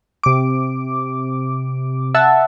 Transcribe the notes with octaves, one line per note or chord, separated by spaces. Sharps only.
C3 D6
E5 F#5 A5